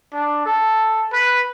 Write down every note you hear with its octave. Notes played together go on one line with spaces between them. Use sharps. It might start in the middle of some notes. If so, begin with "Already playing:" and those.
D4
A4
B4